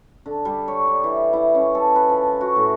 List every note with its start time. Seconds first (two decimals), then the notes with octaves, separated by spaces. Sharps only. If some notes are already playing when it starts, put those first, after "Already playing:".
0.26 D3
0.45 G3
0.68 C#5
0.87 D5
1.04 E3
1.33 E4
1.55 C#4
1.75 A4
1.96 B4
2.09 F3
2.41 F#4
2.56 A2